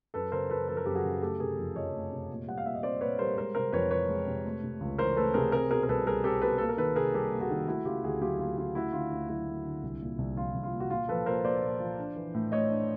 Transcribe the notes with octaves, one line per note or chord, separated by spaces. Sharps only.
F#2 A4 B4
C#3 A#4 C5
F#2 A4 B4
F3 A4
A#4
F#2 G4 A4
F#4 G#4
C#3
A3 G4 A4
C3 G#4 A#4
F2
F3 C#5 D#5
A3
C3
A#2
G3 F#5
F5
A#2 E5
D#5
C4 C5 D5
A#2 B4 C#5
G3 A#4 C5
G#3 A#4 C5
C3 A#4 C5
F2 B4 C#5
E3 B4 C#5
G#3
C3
A3
C3
C#2
E3 A#4 C5
A3 A4 B4
C3 G#4 A#4
C4 G#4 A#4
B2 G#4 A#4
A#4
C2 A4 B4
G3 G#4 A#4
C4 G4 A4
B2 A4 B4
A#3 A4
A#4
D#3 A4 B4
C3 G#4 A#4
G3 G4 A4
A#3
F#4 G#4
D#3
A3 E4 F#4
C#3 F4 G4
D2 F#4 G#4
F#3 F4 G4
A3 F4
C#3 F4
A3 E4 F#4
D3 F4
D2 F4
F#3 E4
A3
D3
C2
A#2
C2
F3 F4
C2
F4
A#2
F#4
A#2 F4
F3 A4 B4
A#2 A#4 C5
A#3 C5 D5
A#2
F3
D4
E3
A2
A3 C#5 D#5
D4